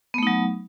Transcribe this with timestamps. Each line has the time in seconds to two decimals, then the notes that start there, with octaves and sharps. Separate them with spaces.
0.14 B3
0.18 A3
0.23 D#4
0.27 F#3